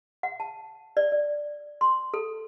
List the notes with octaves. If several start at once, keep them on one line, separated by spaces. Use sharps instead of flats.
F#5
A5
D5
D5
C6
A4